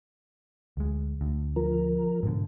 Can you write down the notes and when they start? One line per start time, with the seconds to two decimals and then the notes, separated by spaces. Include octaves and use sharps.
0.77 D2 G#3
1.21 D2
1.56 F3 A#4
2.23 G#2 B2 D3